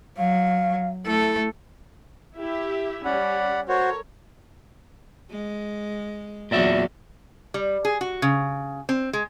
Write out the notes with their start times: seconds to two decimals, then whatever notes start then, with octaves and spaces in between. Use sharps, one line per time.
0.18 F#3 F5
1.06 A3 E4 A4
2.37 E4 G4 E5
3.05 G3 C#4 D5 F#5 B5
3.68 F#4 A4 A#4 C5 C#5
5.31 G#3
6.51 E2 A#2 F#3 D5 E5
7.54 G3
7.85 G#4
8.01 F#4
8.22 C#3
8.89 C4
9.13 G#3